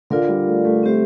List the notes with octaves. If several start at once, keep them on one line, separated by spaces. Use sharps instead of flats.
D3 D4 F4 A#4 D5 F5
G3
A3
A3
A3 C4 G4 C5 E5